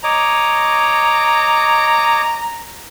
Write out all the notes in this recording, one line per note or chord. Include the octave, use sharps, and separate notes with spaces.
C#5 D#5 A#5 D6